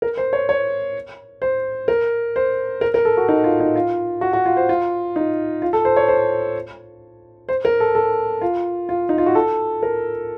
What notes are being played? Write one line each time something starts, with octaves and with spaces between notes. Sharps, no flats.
A#4
C5
C#5
C#5
C5
A#4
C5
A#4
A#4
A4
F#4
D#4
F4
D#4
F4
F#4
F#4
F4
C5
F4
D#4
F4
A4
C5
C#5
C5
C5
A#4
A4
A4
F4
F4
D#4
F4
F#4
A4
A#4